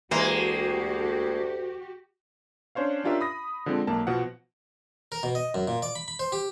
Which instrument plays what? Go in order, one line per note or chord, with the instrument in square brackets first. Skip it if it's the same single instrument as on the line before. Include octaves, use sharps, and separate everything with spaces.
[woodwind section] D2 [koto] E3 C5 A#5 [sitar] G#3 A#3 [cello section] F#4 G4
[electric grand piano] C#4 D4 C5 C#5 F5
C#4 D4 F4 G4 A#4 E5
B5 D#6 A#6
D3 F3 G#3 C4
B1 A#3 A5
B2 F3 F#5
[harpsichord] A#4
B2
D#5
F#2
A#2
D5
B5
B5
C5
G4